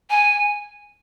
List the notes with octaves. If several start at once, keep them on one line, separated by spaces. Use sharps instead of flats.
G#5